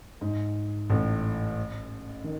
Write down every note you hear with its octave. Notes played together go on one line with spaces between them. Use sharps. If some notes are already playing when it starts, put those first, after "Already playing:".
G#2
A1 A2
D#3